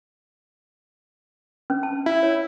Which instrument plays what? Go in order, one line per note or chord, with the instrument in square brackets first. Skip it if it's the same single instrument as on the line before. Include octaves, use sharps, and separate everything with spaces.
[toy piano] C#4
A5
[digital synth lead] E4
[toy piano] C#5